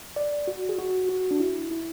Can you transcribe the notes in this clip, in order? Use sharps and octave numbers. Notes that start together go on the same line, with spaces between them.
D5
F#4
G#4
F#4
F#4
D4
E4
E4